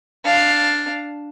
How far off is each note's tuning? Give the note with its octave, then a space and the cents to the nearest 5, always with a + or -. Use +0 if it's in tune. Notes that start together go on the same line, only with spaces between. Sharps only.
D4 +0 F5 +0